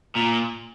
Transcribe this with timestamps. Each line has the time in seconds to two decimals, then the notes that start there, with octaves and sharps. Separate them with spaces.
0.16 A#2